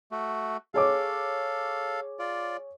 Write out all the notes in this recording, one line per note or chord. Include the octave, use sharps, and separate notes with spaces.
A3 F#4
G#4 A4 C#5 F5 D6
F4 D5